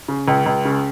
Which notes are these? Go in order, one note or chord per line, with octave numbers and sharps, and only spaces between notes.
C#3
C#2
C#2
C#3